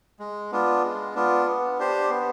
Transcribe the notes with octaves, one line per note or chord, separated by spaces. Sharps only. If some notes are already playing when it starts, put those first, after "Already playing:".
G#3
B3 D4 F4
G#3
B3 D4 F4
B3
D4 G4 C5
B3